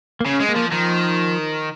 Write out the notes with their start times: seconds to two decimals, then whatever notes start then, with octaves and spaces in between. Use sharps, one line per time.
0.21 A#3
0.26 C#3 C#4
0.41 G#3
0.49 A#3
0.56 F3
0.72 D#3 F3